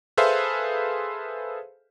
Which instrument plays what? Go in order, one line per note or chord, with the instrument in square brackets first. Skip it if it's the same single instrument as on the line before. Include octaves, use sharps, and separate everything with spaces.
[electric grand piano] G#4 A4 B4 C5 E5 F5